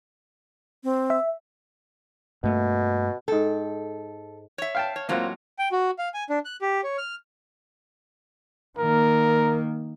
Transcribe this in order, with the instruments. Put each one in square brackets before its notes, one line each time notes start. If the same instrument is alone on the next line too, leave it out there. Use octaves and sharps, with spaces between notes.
[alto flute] C4
[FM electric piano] E5
[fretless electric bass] G2 A3 A#3 [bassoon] B2
[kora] G#2 G5 [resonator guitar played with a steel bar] A4
[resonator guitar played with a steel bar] C#5 E5
[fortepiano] F5 G5 A5
[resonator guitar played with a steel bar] C#5
[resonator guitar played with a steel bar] A2 F#3 G#3 [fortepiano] A#3 C4 F4
[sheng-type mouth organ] G5
F#4
F5
G#5
D4
F#6
G4
C#5
F6
[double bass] D#3 A#3 [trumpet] A#4